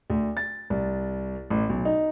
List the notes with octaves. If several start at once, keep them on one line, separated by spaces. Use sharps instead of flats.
D2
A6
C2
A1
B1
D#4